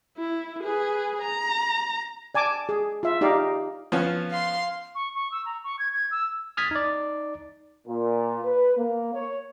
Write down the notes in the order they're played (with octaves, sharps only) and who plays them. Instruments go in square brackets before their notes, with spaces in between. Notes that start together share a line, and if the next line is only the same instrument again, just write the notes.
[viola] E4
G#4 B4
A#5
[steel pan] D5 G#5 A5 D6
G#4
F4 E5
D#4 G4 D5 F5
[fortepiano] F3 B3 C#4
[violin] F5 C6
[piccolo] C#6
C#6
E6
A#5
C#6
G#6
G#6
E6
[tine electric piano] D#6 F6 G#6 A6 B6
D#4 D5
[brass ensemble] A#2
B4
A#3
C#5